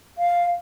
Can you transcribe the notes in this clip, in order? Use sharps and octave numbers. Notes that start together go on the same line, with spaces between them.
F5